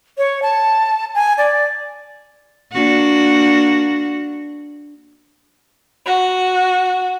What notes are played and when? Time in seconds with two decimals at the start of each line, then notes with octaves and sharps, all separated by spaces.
0.18 C#5
0.42 A5
1.15 G#5
1.38 D5
2.73 A#3 D4 F#4
6.05 F#4